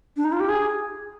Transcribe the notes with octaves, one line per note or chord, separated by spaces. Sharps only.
D4
D#4
F4
G4
G#4